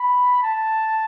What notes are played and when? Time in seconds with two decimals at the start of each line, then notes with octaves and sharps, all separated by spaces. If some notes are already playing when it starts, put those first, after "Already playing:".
Already playing: B5
0.43 A5